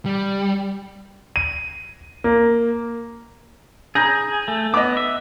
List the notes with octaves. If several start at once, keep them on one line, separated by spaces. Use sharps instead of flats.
G3
D#7
A#3
G#4 A#5 G6 A#6
A3
B3 D#5 D6
E5